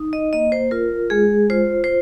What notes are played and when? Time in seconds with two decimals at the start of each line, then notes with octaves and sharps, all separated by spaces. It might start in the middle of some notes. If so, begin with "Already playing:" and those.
Already playing: D#4
0.13 D#5
0.33 A#3 D#5
0.52 C5
0.71 F4 A#4
1.10 G#3 G#4
1.50 F4 C5
1.84 C5